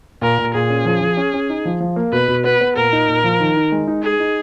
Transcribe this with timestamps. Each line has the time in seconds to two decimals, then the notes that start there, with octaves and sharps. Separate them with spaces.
0.22 A#2 A#4
0.38 A#2
0.54 A#2 G#4
0.70 C#4
0.85 F3
1.01 F3
1.17 C#4
1.34 C#4
1.50 D#4
1.65 F3
1.80 F3
1.96 A#3
2.12 B2 B4
2.28 B2
2.44 B3 B4
2.61 B3
2.76 A#2 A#4
2.92 D#4
3.08 A#2
3.24 F3
3.40 D#3
3.56 D#4
3.72 G#3
3.87 D#4
4.03 D#4 G#4
4.20 D#4